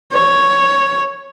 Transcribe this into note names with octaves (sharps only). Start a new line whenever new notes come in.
C#5